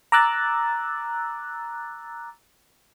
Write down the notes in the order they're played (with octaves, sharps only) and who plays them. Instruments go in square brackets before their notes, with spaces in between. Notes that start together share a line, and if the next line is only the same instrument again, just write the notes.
[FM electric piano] A#5 D6 E6 F#6 A6